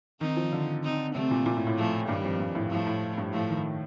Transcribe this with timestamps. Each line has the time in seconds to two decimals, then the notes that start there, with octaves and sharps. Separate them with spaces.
0.21 D#3 C4 D#4
0.37 F3
0.53 D3
0.83 C4 D#4
1.15 C3 A3 C4
1.31 A#2
1.46 A#2
1.57 A2
1.67 A2
1.78 F3 A3
2.08 G2 D#3 G3
2.24 F2
2.40 G2
2.55 A2
2.71 A2 F3 A3
2.87 A2
3.18 G2
3.33 A2 F3 A3
3.49 D#3